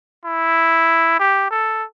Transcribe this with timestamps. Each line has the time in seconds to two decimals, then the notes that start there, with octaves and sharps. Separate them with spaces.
0.24 E4
1.19 G4
1.51 A4